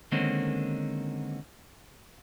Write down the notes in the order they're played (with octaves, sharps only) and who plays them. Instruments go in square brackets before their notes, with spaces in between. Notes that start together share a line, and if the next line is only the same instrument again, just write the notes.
[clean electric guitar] D3 D#3 G#3 A#3 C4 C#4